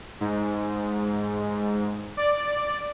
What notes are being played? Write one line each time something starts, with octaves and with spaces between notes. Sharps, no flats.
G#2
D5